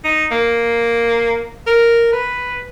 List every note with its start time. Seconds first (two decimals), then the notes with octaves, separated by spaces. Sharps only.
0.04 D#4
0.31 A#3
1.67 A#4
2.12 B4